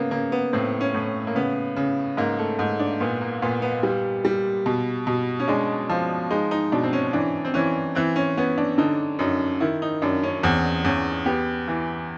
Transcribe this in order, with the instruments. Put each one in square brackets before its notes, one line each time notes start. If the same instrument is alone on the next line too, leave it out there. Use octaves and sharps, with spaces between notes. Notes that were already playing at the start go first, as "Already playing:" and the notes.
Already playing: [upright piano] C#3 [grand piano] A#3 B3
[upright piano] C#3 [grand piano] A#3
[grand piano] B3
[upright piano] A2 [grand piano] C4
[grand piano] C#4
[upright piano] A2
[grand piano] A#3
[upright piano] C#3 [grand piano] B3
[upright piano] C#3
[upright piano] G#2 [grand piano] A#3
[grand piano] A3
[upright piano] G#2
[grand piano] D4
[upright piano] A#2 [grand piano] B3
[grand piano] A#3
[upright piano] A#2 [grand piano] B3
[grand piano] B3
[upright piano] G3
G3
B2
B2
[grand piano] C#4
[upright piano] G#3 [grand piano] D4
[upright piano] F3
[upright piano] G#3 [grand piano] D#4
[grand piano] D#4
[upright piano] B2 [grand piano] D4
[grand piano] C4
C#4
[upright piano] E3 [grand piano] D4
[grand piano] C4
[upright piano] E3 [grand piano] C#4
[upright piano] E3 [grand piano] C4
[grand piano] C#4
[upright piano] B3 [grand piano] C#4
[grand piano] D4
[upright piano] D3 [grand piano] D#4
[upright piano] F#2 [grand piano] D#4
[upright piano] D#3 [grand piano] E4
[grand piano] D#4
[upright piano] F#2 [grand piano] D4
[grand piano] C#4
[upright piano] E2 [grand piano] C4
[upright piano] E2 [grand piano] C#4
[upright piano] B3 [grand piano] G4
[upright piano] E3